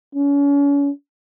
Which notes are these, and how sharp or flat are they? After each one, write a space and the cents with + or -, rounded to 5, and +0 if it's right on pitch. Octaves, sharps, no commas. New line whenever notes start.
C#4 +35